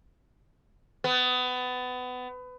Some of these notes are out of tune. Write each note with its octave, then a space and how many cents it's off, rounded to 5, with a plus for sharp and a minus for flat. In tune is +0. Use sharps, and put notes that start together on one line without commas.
B3 +25